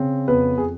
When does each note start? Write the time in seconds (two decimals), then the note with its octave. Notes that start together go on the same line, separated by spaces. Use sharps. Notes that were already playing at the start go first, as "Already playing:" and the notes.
Already playing: C#3 C4
0.28 F2 B3 B4
0.58 G#4